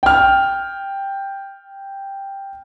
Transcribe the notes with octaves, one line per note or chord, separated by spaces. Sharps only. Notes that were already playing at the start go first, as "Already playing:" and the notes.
G5 F6